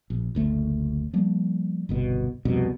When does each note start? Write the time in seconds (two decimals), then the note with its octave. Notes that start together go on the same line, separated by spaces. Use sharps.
0.10 A#1
0.35 F#1 D2 A3
1.13 F3 G3 A#3
1.89 G1 C2 B2
2.45 C2 F2 B2